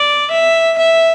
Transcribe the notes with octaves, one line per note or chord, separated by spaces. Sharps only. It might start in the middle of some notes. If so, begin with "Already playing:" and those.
Already playing: D5
E5
E5